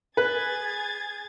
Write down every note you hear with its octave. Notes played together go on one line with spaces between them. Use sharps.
G#4 B4 G#6 A6